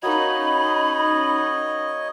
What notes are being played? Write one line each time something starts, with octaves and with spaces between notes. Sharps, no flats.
A#3 C#4 D#4 F#4 C#5 D#5 B5